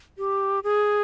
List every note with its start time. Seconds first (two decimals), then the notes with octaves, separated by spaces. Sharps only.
0.18 G4
0.64 G#4